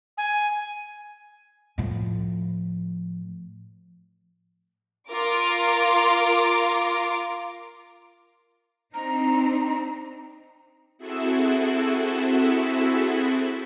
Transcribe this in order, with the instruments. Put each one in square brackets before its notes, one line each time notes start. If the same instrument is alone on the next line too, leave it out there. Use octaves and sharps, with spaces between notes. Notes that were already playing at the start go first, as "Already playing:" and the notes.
[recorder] G#5
[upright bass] A2 F3
[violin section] F4 A#4 D6
[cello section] C4 D4 D#4 [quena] A#5
[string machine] C4 E4 F#4 G#4 A4 E5